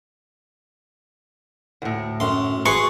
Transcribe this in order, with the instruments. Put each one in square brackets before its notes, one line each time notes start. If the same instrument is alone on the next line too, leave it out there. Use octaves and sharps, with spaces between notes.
[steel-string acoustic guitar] D2 A2
[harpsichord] F#2 C6 [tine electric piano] A3
[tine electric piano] G#1 F#4 C7 [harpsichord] G#4 B4 C6 [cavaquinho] C#6